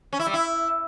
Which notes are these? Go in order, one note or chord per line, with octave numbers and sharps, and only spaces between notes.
C#4
E4
G3
E4